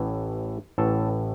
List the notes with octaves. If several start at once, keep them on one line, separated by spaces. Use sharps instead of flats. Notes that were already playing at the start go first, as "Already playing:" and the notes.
Already playing: A1 A2 E3
A1 A2 E3 A4